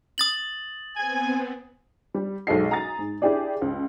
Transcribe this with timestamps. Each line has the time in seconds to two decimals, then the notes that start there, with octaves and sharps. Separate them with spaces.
0.18 D#6 A6 F#7
0.97 B3 C4 G#5
2.14 G3
2.47 B1 G#3 A4 D#5 C7
2.70 G#5 A#5 D#6 A6
2.99 G#2
3.22 D4 E4 G4 G#4 D5
3.61 C#2